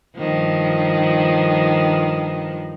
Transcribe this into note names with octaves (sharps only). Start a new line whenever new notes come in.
G2 D#3 F3